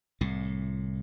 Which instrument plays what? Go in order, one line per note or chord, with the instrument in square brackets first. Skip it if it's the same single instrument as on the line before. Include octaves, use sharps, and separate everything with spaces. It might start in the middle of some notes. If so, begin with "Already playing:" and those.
[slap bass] C2 A2